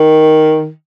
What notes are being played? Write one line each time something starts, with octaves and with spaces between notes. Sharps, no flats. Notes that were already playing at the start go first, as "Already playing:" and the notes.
Already playing: D#3